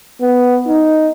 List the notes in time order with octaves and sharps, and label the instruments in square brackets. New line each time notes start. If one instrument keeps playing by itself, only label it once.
[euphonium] B3
D#4